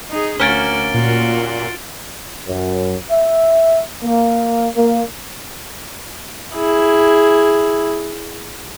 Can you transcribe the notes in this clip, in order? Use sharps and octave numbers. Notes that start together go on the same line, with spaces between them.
D#4 G#4
D2 A#3 C#4 F#4 A6 D7 G7
A#2 F4 F#4
F#2
E5
A#3
A#3
E4 G#4